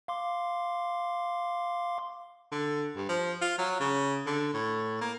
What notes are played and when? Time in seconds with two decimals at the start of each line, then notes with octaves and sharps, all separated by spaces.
0.08 F5 C6 D6
2.51 D3
2.96 G2
3.09 F3
3.41 F4
3.58 F#3
3.80 C#3
4.26 D3
4.54 A2
5.01 A#3